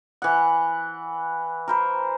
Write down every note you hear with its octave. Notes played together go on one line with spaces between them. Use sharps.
E3 F#5
A#4 C5 B5